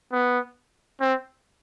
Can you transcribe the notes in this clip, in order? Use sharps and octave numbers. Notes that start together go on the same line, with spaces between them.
B3
C4